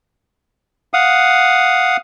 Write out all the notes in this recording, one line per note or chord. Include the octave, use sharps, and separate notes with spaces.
F5 F#5 D#6